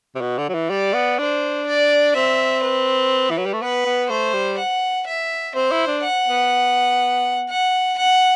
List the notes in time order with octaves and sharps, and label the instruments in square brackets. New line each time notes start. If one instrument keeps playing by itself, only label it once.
[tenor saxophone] C3
B2
D3
F#3
E3
[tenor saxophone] G3 [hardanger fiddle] D5
[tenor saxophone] B3
[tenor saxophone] D4 [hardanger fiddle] C5
[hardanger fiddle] D5
[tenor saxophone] C4 [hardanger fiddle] E5
[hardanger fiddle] B4
[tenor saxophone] E3
F#3
G3
A3
[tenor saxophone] B3 [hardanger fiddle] B4
[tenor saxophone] B3
[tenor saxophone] A3 [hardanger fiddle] C5
[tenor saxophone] G3
[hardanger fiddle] F#5
E5
[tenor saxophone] C4 [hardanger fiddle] C5
[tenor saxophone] E4
D4
[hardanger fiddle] F#5
[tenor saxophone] B3
[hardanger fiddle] F#5
F#5